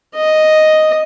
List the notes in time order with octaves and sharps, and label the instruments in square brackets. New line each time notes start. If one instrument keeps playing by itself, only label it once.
[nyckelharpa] D#5